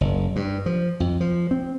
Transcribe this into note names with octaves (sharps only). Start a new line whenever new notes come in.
F#1
G2
F3
F2
F3
C4